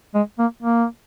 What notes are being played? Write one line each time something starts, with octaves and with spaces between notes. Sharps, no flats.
G#3
A#3
A#3